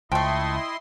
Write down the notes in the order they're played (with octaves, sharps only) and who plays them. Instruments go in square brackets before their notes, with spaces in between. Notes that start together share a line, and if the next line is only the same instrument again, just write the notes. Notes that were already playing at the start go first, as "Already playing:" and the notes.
[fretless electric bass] C#2 [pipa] F3 A3 [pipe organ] E4 D#5 C6 [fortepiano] G5